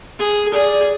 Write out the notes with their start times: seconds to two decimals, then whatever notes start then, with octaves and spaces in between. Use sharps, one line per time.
0.19 G#4
0.54 G#4 D5